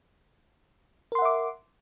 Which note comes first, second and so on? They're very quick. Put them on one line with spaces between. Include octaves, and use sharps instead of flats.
A#4 C6 F#5 E5 D6